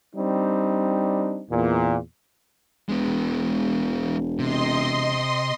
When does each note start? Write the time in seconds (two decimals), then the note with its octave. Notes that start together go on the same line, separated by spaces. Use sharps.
0.15 G3 C4 D4 D#4
1.51 E2 A#2
2.89 E1 G#3 B3
4.39 C3 D#5 C6